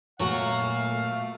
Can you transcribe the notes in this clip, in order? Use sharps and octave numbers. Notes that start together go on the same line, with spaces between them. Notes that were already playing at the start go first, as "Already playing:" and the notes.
A#2 F#3 A3 F#4 F5 F#5